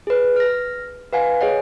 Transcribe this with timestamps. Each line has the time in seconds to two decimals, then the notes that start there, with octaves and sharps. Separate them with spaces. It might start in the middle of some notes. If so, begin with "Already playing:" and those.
0.07 G#4 B4
0.36 F6 A#6
1.13 B4 F5 F#5 G#5
1.40 G#4 C#5 D#5 F#5 G#5